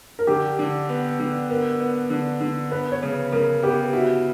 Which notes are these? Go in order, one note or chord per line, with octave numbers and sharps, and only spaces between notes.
A#4
D3 G4
D3
B3
D3
B3 A#4
B3
D3
D3
B3 B4
C#5
C#3
C#3 A#4
B3 G4
E4 F#4